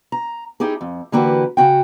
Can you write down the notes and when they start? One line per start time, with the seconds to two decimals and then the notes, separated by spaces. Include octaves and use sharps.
0.12 A#5
0.60 D#4 E4 G4 G#4
0.81 F2
1.12 D3 E3 A#3 F#4 G4 B4
1.57 C#3 F#4 G5